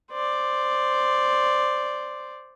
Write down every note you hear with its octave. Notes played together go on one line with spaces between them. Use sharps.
C5 D5